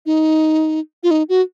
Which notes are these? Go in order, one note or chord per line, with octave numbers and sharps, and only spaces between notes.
D#4
F4
D#4
F#4